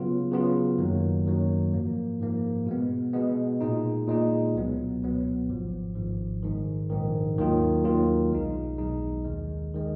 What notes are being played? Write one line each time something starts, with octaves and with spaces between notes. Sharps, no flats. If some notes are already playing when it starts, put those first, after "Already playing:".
Already playing: C#3 F#3 B3 F4
C#3 F#3 B3 F4
F#2 D#3 F#3 A#3
F#2 D#3 F#3 A#3
G#2 F3 A#3
G#2 F3 A#3
B2 G#3 B3
B2 G#3 B3
A#2 G#3 D#4
A#2 G#3 D#4
C#2 B2 F#3 B3
C#2 B2 F#3 B3
G#1 G#2 F3
G#1 G#2 F3
A#1 G#2 D#3
A#1 G#2 D#3
D#2 D#3 F#3 A#3 F4
D#2 D#3 F#3 A#3 F4
B1 B2 G#3 D#4
B1 B2 G#3 D#4
D#2 D#3 G#3
D#3 G#3